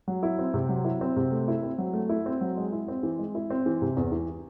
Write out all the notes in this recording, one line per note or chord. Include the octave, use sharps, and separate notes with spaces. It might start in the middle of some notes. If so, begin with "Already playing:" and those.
F#3
E4
C4
C3
F#3
E4
C4
C3
A3
E4
C4
F#3
A3
E4
C4
F#3
G#3
E4
C4
E3
G#3
E4
C4
E3
C3
E2
E3